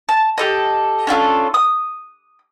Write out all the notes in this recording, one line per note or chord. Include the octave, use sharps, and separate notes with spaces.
A5
G4 A4 D#5
C#4 D4 F4 A4
D#6